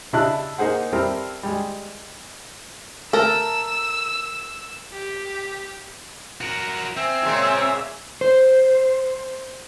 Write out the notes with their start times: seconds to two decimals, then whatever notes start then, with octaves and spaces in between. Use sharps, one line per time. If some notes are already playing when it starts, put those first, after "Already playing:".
0.13 C#3 D4 E4 D#5 A5 F#6
0.58 A#3 D#4 G#4 C5 F#5
0.93 G3 C4 E4 A4 A#4
1.43 G3 G#3
3.13 A3 A4 A#4 E6
4.92 G4
6.41 F#4 A#4
6.97 C4 C5 E5 G5 G#5
7.23 A#2 C#3 G#3
8.21 C5